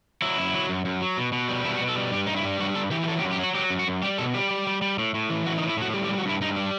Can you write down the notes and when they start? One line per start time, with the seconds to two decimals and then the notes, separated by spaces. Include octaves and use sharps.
0.22 F#3 E4
0.38 F#2
0.54 F#3
0.69 F#2
0.85 F#2
1.02 F#3
1.17 B2
1.32 B2
1.49 G3
1.65 B2 E4
1.77 F#4
1.81 B2
1.89 A4
1.96 G3
2.12 G2 G4
2.27 G2 D#4
2.36 E4
2.45 G3
2.60 G2 F#4
2.75 G2 A4
2.91 E3 G4
3.03 G4
3.08 F#3 A4
3.19 G4
3.24 F#2
3.31 G4
3.39 F#3 F#4
3.55 F#3 G4
3.70 F#2
3.79 F#4
3.87 F#2
4.03 G3 G4
4.18 B2 A4
4.34 G3 G4
4.50 G3
4.67 G3
4.82 G3
4.99 A2
5.14 A2
5.30 E3
5.46 A2 F#4
5.58 D#4
5.62 A2
5.70 E4
5.77 A2 F#4
5.94 G3 G4
6.05 G4
6.09 G3
6.18 F#4
6.25 G2 E4
6.41 G2 D#4
6.56 G3